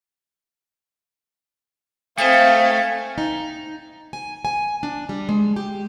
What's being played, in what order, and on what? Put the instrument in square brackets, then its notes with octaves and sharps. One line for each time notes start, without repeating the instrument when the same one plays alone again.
[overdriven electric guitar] A3 [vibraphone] C4 C5 D#6 [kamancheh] F5 G5 [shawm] G#5
[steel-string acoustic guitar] D#4
G#5
G#5
D4
G3
G#3
G4